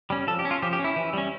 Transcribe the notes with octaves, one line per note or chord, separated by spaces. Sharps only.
G3 C#4
F3 A4
G4
C#4
F4
F3 G4
G4
C#4
E4
E3
G3 C#4